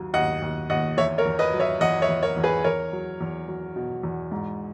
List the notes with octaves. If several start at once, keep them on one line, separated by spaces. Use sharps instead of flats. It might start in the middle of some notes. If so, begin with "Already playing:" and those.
Already playing: D#2 F#3
D#2 D#5 F#5
D#2
D#2 D#5 F#5
E2 C#5 E5
A#4 C#5
E2
B4 D#5
F#3
C#5 E5
E2 D#5 F#5
C#5 E5
E2
A#4 C#5
E2
G#4 B4
E2 A#4 C#5
F#3
E2
F#3
B2
E2
G#2